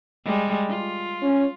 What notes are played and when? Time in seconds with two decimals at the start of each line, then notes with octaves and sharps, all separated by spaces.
0.25 G3 G#3
0.69 F4
1.23 C#4